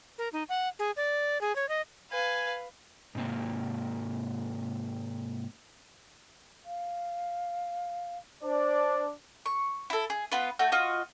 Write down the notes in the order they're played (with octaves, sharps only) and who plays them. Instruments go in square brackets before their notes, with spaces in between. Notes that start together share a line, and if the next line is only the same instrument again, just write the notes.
[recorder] A#4
D#4
F#5
G#4
D5
G#4
C#5
D#5
[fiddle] B4 F5 [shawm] G#5
[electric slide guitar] G#2 C3 A#3
[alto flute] F5
[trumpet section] D4 D5 [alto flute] C5
[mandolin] C#6
E4 A4
G#4
B3 F4 B4
A3 F#4 G6
F4 F#4 D#5